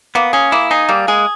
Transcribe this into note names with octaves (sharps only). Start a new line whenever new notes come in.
A#3 B3
C#4 G#4
A#3 E4
D#4 G#4
G3 A#3
G#3 G#4